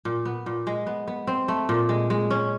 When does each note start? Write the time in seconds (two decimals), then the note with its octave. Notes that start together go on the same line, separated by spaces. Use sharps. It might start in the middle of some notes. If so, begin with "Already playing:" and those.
0.05 A#2
0.25 B3
0.46 A#2
0.67 G#3
0.87 B3
1.08 B3
1.27 C4
1.48 A3
1.69 A#2
1.89 G#3
2.10 G#3
2.31 C#4